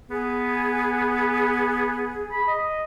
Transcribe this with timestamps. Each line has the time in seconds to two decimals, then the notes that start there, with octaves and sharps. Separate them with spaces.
0.10 B3 G#4
2.32 B5
2.47 D#5